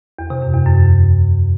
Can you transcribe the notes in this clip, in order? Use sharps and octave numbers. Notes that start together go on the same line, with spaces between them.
E2
C3
F#2
E2
F#2